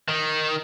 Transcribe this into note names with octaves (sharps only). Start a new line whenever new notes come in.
D#3